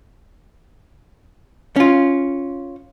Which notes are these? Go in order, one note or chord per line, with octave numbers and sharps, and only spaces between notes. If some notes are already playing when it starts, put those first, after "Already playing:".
C#4 F4